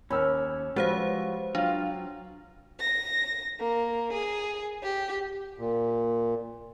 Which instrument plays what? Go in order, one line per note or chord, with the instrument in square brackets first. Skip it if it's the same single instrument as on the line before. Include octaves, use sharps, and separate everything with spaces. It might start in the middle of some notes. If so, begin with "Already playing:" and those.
[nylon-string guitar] D#2 [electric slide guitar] C#4 [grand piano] B5 E6 F6
[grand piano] F3 G3 F#4 [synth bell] G#3 C5 F5 [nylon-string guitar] B4
[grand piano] F#3 [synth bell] D4 [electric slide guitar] F4 F5
[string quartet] A#6
A#3
G#4
G4
[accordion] A#2